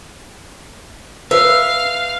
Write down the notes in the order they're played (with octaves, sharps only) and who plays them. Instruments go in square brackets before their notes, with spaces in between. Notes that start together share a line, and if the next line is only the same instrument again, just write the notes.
[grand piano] B4 [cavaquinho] E5 [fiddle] F5